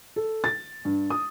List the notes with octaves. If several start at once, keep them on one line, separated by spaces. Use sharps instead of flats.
A4
A6
G2
D#6